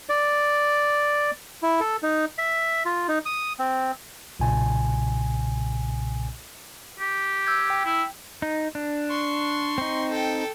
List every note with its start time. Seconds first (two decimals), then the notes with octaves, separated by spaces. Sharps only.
0.09 D5
1.63 E4
1.80 A4
2.03 D#4
2.38 E5
2.85 F4
3.08 D#4
3.26 D#6
3.59 C4
4.40 B1 A#2 C#3 G#5
7.00 G4
7.47 E6 G6 G#6
7.70 G5
7.85 E4
8.42 D#4
8.75 D4
9.10 C6 C#6
9.78 C4 D#4
10.09 A4 G5